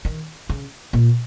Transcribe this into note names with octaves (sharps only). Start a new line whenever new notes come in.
D#3
C#3
A#2